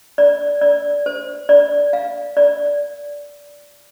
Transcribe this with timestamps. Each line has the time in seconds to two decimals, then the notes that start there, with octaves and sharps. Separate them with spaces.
0.18 D5
0.61 D5
1.06 C5
1.49 D5
1.93 F5
2.37 D5